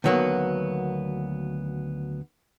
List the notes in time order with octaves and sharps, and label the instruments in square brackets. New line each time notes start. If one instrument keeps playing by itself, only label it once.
[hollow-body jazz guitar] D2 D#3 F#3 A#3 B3